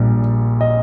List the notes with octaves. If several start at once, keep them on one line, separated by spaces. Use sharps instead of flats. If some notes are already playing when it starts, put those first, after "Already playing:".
Already playing: A#1 A#2 G3
D#5